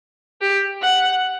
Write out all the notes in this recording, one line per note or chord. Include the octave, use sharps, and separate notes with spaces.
G4
F#5